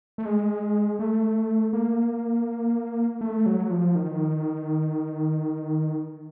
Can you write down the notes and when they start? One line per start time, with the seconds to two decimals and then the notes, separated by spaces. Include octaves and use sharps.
0.18 A3
0.25 G#3
0.99 A3
1.73 A#3
3.21 A3
3.46 F#3
3.70 F3
3.95 D#3